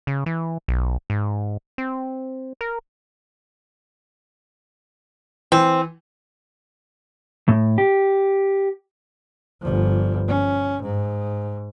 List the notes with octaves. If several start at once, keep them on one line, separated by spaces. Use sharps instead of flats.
C#3
E3
B1
G#2
C4
A#4
E3 C4
A2
G4
G1 F3
C#4
G#2